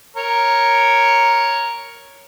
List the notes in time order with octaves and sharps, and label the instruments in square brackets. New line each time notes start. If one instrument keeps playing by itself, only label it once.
[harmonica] A#4 C#5